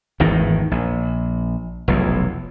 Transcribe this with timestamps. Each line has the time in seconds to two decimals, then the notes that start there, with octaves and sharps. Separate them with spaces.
0.20 G#1 E2 A2 D#3
0.71 A#1
1.88 F1 B1 E2